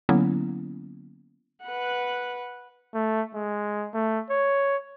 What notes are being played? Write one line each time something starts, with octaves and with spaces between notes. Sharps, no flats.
D3 F#3 A#3 B3 C#4 E4
B4 F#5
A3
G#3
A3
C#5